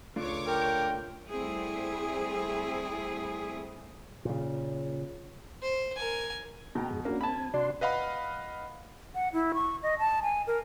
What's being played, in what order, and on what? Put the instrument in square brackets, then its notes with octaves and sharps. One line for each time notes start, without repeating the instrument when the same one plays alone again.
[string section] C#2 C#5 D6 [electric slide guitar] A3 D4 F4
[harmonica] A#4 [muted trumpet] G5
[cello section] G3 A3 C4 E4 G#4
[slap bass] A#2 C#3
[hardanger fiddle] C5
A#4 G#5
[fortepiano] B2 [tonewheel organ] G5 A#5
[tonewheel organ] F2 G#2 G#4
[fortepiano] A#3 [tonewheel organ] C#4 D4 F#4
[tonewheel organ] C4 G#5 [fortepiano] A5 B5
[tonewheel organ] C3 F#4 C6 [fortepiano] D4
[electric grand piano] B4 D#5 F5 F#5 B5
[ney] F#5
E4
C#6
D#5
A5
G#5
A#4